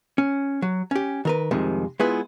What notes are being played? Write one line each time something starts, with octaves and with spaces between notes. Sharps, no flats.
C#4
F#3
C#4 G4
D#3 A#4 B4
C2 F2 C3 D#3 G#3
G#3 B3 E4 F4 G#4 B4